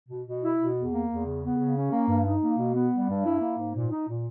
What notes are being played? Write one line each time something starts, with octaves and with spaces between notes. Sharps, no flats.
B2
B2
E4
B2
E2
A#3
E2
C#3
B3
C#3
C#4
A#3
G2
D#4
A#3
B2
B3
G3
G2
E4
A#3
G#2
A#2
D#4
A#2